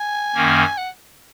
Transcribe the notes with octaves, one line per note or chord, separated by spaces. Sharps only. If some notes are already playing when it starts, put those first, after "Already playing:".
Already playing: G#5
F#2 D#3 A#3 C#4
F#5